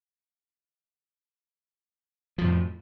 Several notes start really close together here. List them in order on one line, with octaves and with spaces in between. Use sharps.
F3 F2 A2